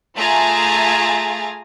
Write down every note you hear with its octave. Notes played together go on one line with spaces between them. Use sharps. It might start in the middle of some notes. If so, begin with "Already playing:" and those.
A3 F4 G#4 G#5 A#5 A6